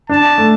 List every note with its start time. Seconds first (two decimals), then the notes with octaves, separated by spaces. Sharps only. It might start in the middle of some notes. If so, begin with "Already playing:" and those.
0.09 D4 A5
0.38 A3